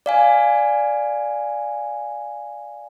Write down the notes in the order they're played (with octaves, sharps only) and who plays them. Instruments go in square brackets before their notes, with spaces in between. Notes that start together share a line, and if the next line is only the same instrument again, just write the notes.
[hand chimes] D5 F5 G#5